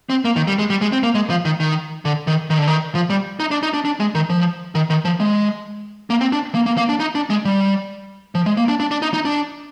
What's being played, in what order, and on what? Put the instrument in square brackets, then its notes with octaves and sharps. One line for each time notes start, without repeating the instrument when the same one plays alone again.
[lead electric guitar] C4
A#3
D#3
G3
G#3
G3
G#3
C4
A#3
G#3
F3
D#3
D#3
D3
D#3
D#3
D3
D#3
F3
G3
D#4
D4
D#4
D4
D4
G#3
D#3
F3
D#3
D#3
F3
G#3
A#3
C4
D4
A#3
A#3
A#3
D4
D#4
D4
G#3
G3
F3
G#3
A#3
D4
D4
D4
D#4
D#4
D4